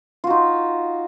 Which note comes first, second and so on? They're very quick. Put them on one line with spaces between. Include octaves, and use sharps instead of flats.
F4 F#4 D#4